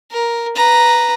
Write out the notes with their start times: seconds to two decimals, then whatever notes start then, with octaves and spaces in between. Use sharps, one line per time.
0.11 A#4
0.56 B4 A#5